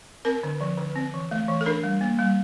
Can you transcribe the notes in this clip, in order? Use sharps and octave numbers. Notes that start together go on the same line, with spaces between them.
C4 A#4
D3
F3
D3
C4
E3
A3
E3
A4
D4 A#4
G3
A#3
G3